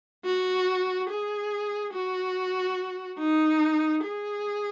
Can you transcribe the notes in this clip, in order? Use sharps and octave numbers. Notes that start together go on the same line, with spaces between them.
F#4
G#4
F#4
D#4
G#4